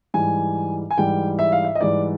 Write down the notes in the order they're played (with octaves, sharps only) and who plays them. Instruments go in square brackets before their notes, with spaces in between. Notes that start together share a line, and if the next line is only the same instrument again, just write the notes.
[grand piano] G#2 E3 G3 G#5
G#5
G#2 E3 G3 G5
E5
F5
E5
D#5
G#2 E3 G3 D5